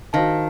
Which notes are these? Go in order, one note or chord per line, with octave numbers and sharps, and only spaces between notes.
D#3 F#4 C5 F5 A5